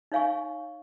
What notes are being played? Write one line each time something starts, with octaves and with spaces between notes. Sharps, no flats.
D#4 C#5 F5 G#5 C#6